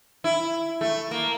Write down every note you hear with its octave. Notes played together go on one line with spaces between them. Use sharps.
E4
A3
A#3